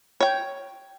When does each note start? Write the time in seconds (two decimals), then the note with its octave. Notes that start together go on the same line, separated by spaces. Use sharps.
0.20 C#5 G5